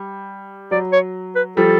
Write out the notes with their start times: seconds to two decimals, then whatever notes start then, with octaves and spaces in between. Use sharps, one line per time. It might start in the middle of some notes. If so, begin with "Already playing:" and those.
Already playing: G3
0.71 F#3 D5
0.92 C#5
1.35 B4
1.57 F3 G3 A4